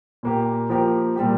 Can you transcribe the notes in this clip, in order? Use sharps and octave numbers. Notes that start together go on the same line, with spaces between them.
A#2 A#3 G4
F3 A#3 G4 A#4
A#2 G3 A#3 G4